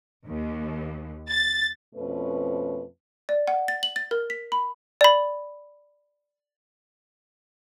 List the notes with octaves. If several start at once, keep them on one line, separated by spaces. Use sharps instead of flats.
D#2
A6
F2 B2 A3 C#4 B4
D5
F#5
A6
F#7
A6
A#4
B6
B5
D5 B5